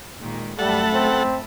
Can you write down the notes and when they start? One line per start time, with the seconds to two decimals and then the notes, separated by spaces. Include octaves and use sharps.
0.20 A#2 D#3 G#3
0.59 F#2 G3 A3 A4 E5 F#5 A5 B5
0.94 C4